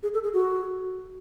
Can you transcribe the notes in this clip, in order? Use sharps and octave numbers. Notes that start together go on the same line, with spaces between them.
G#4
A4
G#4
F#4